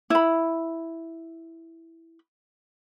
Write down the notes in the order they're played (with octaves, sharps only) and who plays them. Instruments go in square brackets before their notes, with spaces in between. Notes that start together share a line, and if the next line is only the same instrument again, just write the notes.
[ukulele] E4 B5